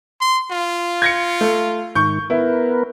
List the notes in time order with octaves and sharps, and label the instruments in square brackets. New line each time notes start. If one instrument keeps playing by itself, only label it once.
[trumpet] C6
F4
[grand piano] G#6 A#6 C#7
A3
[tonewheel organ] G#2 D#3 [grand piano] C#6 G6
[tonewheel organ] B3 A#4 B4 [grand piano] E4